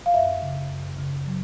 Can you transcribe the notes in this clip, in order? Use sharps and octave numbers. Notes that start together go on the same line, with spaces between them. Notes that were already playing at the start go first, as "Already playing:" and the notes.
F5
F#2 E5
C#3
F#2
C#3
F#3